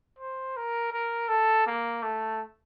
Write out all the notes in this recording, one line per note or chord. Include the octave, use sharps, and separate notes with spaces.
C5
A#4
A#4
A4
A#3
A3